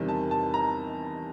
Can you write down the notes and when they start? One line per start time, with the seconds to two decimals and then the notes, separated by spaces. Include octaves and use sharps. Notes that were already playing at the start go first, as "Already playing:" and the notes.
Already playing: E2 C3 D#3 G3
0.08 A5
0.31 A5
0.54 A#5